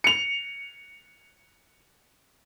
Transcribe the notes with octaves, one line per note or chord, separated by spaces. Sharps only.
C#7 F7